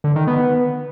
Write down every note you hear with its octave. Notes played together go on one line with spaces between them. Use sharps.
D3
D#3
B3